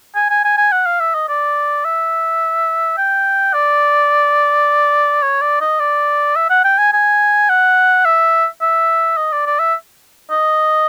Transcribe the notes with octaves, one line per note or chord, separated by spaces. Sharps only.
G#5
G#5
G#5
G#5
F#5
F5
E5
D#5
D5
E5
G5
D5
C#5
D5
D#5
D5
E5
F#5
G5
G#5
G#5
F#5
E5
E5
D#5
D5
D5
E5
D#5